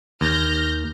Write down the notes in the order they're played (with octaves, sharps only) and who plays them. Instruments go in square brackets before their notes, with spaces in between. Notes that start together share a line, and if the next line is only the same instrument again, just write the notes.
[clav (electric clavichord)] D#2 [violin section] F6 G6 A#6